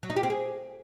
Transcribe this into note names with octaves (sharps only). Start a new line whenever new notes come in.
F#3
D#4
G4
C4
G#4